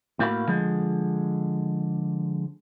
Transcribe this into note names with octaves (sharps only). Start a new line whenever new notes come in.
A2 A3 A#3 F#4 F5 B5
D3 F3 G#3